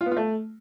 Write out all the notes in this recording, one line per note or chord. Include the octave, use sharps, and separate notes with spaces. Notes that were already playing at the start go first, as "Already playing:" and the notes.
F4
B3
F4
A3